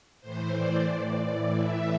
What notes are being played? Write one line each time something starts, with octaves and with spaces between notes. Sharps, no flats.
A2 E3 C5
D5
A2 E3
D5
A2 E3 E5